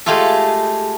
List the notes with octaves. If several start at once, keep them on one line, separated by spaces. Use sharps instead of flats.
G#3 A3 F4 G4 A4